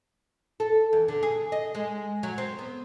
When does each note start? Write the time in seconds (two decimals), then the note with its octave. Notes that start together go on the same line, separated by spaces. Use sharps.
0.60 A4
0.93 E2
1.08 D3
1.23 G#4
1.52 D#5
1.75 G#3
2.23 F#3
2.38 C4
2.59 B3